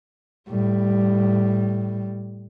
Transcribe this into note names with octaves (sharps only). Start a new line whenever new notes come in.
A2 G3